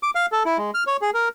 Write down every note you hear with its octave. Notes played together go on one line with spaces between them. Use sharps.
D6
F5
A4
E4
G#3
F6
C#5
G#4
A#4